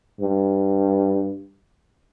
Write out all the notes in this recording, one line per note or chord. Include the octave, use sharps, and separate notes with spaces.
G2